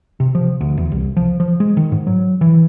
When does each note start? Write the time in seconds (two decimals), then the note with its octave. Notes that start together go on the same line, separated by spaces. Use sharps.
0.20 C3
0.35 F3
0.61 D2
0.77 E2
0.92 C2
1.17 F3
1.40 F3
1.60 G#3
1.77 D#3
1.92 G#2
2.07 F#3
2.41 E3